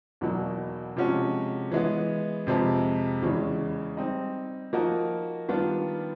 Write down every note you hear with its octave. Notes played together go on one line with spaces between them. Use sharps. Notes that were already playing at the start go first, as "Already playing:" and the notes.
E2 B2 F#3 A#3 D#4
C3 F3 G#3 C#4 F#4
E3 G#3 B3
F2 C3 F3 G#3
E2 C#3 E3 G#3 C#4
G3 C4 D#4
F3 A#3 D#4 F#4 A#4
D#3 G3 B3 D4 F4